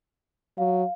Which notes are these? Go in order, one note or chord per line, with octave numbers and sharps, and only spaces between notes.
F#3 F5